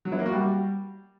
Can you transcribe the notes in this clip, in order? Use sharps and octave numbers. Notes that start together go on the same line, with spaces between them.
F#3
E4
A#3
F#4
G3